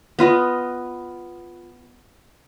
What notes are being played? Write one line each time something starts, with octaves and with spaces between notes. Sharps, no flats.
B3 F4 D#5